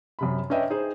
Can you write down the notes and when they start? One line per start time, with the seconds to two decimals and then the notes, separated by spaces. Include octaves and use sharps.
0.19 F#2 C3 B5
0.50 C#4 D4 B4 D#5 E5 G5
0.70 D#4 G#4 C5